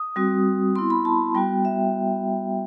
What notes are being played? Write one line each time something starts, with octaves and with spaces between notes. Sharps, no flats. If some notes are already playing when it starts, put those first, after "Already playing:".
Already playing: D#6
G3 C4 F#4
B3 E4 C6
B5
A5
G3 B3 F#4 G5
E5